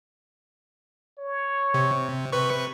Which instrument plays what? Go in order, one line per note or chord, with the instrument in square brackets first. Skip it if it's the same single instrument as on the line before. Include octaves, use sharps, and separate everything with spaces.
[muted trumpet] C#5
[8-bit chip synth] C3
C3 B4 C#6